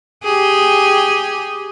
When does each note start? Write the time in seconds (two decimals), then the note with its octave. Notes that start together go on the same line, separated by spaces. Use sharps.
0.24 G4 G#4